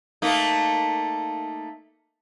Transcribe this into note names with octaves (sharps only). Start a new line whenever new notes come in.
A3 A#3 D#4